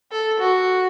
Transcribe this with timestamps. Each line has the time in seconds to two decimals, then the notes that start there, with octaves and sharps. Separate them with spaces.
0.11 A4
0.39 F#4